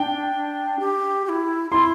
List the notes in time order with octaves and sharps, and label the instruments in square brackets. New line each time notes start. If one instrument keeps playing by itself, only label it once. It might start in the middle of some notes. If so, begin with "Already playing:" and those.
Already playing: [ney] D4 [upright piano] G5
[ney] G4
G4
E4
[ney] E4 [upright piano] C6